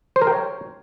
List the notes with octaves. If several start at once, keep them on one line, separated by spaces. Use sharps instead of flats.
C5
A#4
G5
C#5